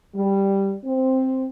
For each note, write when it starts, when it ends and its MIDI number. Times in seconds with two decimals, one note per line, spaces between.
0.16 0.74 55
0.85 1.48 60